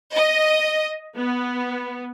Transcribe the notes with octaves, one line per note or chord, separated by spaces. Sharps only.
D#5
B3